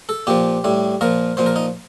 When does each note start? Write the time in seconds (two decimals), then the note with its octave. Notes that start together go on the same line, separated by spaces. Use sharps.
0.09 A4
0.27 A#2 F3 G4
0.64 A2 G3
1.01 A#2 F3 A#4
1.37 A#2 F3 C5
1.46 A#4
1.56 D#4